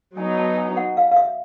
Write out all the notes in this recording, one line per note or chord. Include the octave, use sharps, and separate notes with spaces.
F#3 B3 D#4 G#5
A5
G#5
F#5
F5
F5
E5